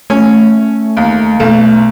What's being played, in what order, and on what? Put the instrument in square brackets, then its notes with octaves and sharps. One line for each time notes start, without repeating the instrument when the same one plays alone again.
[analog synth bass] A3 [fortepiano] C#4
[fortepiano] D#2
[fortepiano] B1 [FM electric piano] A3